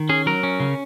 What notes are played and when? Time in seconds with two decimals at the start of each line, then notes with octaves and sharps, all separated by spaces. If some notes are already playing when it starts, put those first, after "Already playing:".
Already playing: D#3
0.09 C#4 G#4
0.26 F#3 A#4
0.43 C#4
0.60 C#3